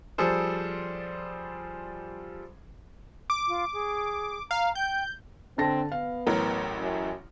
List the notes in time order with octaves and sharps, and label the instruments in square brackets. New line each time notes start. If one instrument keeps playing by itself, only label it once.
[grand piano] F3 G3 G#4 A4 C5
[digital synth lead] D6
[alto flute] F4
G#4
[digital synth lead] F5 [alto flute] A#5
[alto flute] G5 [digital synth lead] G6
[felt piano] D3 A5 A#6 [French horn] C4
[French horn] B3 [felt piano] F5
[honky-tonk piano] A1 A2 F#3 [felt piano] A#4
[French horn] F#2